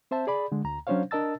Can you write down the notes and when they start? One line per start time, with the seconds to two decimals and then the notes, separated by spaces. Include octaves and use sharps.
0.11 C4 C5 E5 A5
0.27 G#4 D5 B5
0.52 D3 G#3
0.64 D2 A#5
0.87 F#3 C#4 D4 C5 C#5 F5
1.11 D4 A#4 D#5 A5 E6 A6